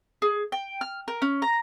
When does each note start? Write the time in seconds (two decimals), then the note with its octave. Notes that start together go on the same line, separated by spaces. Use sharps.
0.22 G#4
0.52 G5
0.81 F6
1.08 A#4
1.22 C#4
1.42 A#5